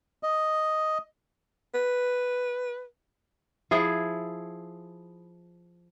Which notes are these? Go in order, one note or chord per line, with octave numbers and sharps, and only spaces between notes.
D#5
B4
F3 E4 G#4